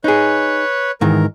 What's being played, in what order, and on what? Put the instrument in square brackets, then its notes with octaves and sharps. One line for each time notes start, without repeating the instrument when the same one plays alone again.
[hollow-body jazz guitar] D#4 G#4 [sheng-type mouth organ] B4 C#5
[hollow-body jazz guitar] G#2 D#3 E3 [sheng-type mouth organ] A#4